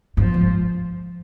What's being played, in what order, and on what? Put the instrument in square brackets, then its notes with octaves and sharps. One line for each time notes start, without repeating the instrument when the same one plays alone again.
[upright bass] G2 [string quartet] F3
[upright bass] G#2